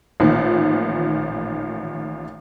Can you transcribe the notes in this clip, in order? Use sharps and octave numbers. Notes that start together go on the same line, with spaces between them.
A1 A#2 D#3 F3